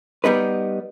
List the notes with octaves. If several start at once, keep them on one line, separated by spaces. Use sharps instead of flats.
G3 B3 D#4 B4